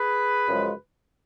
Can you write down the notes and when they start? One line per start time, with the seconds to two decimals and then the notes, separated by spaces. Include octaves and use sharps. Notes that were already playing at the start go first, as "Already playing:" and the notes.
Already playing: G#4 B4
0.48 F#2 C#3 F3 G#3